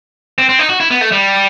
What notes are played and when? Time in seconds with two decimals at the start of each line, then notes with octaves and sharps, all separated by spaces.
0.38 C4
0.49 C4
0.59 D#4
0.69 F#4
0.80 E4
0.91 B3
1.01 A3
1.12 G3